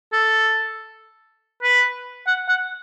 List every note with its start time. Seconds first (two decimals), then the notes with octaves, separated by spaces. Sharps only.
0.13 A4
1.63 B4
2.27 F#5
2.49 F#5